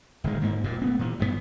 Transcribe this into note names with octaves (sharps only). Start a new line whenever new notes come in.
D1 D#3 G#3
G#2 A#3
D#1 F#2 A#2
A3 B3 C4
A#2 E3
G#1 G2 C#3 B3